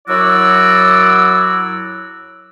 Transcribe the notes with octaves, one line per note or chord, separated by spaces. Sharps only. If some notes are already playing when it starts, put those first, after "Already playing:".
F#2 F#3 E4 F#4 D5 E6